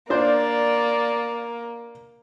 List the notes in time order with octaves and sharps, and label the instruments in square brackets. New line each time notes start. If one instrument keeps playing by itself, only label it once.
[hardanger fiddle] A#3 [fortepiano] D4 C5 [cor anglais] D5